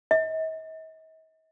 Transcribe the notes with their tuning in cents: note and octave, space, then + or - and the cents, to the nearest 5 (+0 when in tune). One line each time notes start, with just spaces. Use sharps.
D#5 +45